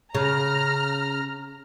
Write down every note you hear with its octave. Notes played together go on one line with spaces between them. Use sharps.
C#3 A#5 F6